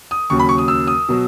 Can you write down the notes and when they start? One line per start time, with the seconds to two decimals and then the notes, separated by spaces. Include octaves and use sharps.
0.11 D#6
0.30 D#2 C#3 F#3 C#6
0.39 B5
0.49 C#6
0.58 D#6
0.68 E6
0.87 D#6
1.09 B2 F#3